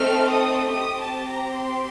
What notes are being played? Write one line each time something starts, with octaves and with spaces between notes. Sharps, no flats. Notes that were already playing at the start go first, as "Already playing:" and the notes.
Already playing: A3 C4 D#4 A4 F6
D#6
C4 G4 D#6
A5
A#5
C6